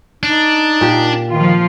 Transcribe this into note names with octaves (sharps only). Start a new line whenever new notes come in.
D4 D#4
A#2 G4
D#3 F3 F4